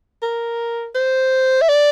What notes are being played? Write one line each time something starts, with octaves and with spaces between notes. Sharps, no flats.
A#4
C5
E5
D5